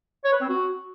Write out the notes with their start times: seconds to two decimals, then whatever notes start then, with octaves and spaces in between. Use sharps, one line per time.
0.25 C#5
0.33 B4
0.41 C4
0.49 F#4